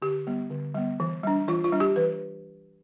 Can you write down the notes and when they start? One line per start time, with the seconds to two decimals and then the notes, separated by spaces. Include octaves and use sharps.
0.02 D3 G4
0.27 G3 B3
0.50 D3
0.75 G3 B3
1.00 E3
1.23 G3 D4
1.48 E3 F4
1.64 F4
1.73 G3 D4
1.80 G4
1.96 E3 B4